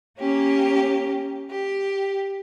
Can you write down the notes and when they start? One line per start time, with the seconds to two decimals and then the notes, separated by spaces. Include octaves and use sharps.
0.19 A#3 C#4 G4
1.50 G4